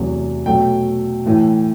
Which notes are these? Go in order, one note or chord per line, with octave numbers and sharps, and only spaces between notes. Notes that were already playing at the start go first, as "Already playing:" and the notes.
Already playing: E2 C3 F#3 A3
B2 F#3 A3 G5
A2 E3 A3